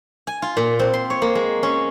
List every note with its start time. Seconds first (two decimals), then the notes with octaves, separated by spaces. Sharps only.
0.27 G#5
0.42 F4
0.57 A#2
0.79 C4
0.94 C6
1.10 C#5
1.22 A#3
1.35 G#3
1.63 C#4